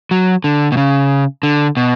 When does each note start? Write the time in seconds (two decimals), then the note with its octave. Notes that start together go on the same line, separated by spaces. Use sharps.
0.11 F#3
0.44 D3
0.72 B2
0.77 C#3
1.43 D3
1.77 B2